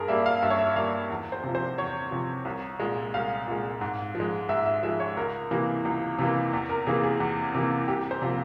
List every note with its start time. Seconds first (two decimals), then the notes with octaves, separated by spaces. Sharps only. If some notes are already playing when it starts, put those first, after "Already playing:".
Already playing: G2 G#4 A#4
0.08 G3 A#3 E5
0.26 F5
0.42 G2 E5
0.50 C#5
0.59 E5
0.76 G3 A#3 F5
1.10 E2
1.32 C5
1.44 C3 F3
1.55 C5
1.78 E2 C#5
2.11 C3 F3
2.45 C2
2.80 A#2 G#3
3.14 C2 F5
3.48 A#2 G#3
3.81 G#2
4.15 F3
4.20 G#3
4.49 G#2 E5
4.66 E5
4.83 F3 G#3 E5
5.00 C#5
5.17 C#2 A#4
5.51 C3 E3 A#3
5.85 C#2
6.19 C3 E3 A#3
6.53 E2
6.69 A#4
6.87 C3 E3 A#3 G#4
7.04 G#4
7.20 E2
7.55 C3 E3 A#3
7.88 C2 G4
8.11 C5
8.22 C3 F3 A#3